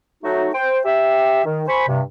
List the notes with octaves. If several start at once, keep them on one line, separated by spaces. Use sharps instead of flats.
F#3 A3 D#4 F#4
C5 G5
G4 E5
D#3
C5 G#5 B5 C#6
G2 C3